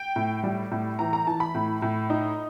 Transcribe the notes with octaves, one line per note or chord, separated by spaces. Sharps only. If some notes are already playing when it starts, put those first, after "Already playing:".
Already playing: G5
A2
G3
A2
E3 A#5
A#5
E3 A5
B5
A2
A2
D#4